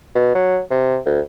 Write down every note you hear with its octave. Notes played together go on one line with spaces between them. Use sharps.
B2
F#3
C3
D2